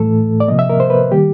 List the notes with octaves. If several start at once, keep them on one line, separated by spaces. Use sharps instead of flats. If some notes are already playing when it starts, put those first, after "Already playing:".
Already playing: A2 E3 A3 A4
D5
C3 F3 A#3 D#5
E5
A#4
C5
B4
D#3 G3 A#3 G4